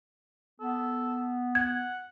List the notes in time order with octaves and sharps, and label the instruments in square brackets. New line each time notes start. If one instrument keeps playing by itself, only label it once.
[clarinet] B3 [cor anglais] A4
[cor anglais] F#5 [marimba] G#6